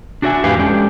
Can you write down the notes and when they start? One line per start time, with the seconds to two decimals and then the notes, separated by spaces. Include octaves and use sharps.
0.22 D4 F#4 G4 D5 E5 G#5
0.44 F2 A2 G4 B4 F5 G#5
0.59 G#3 C#4 D4 G4 A4 B4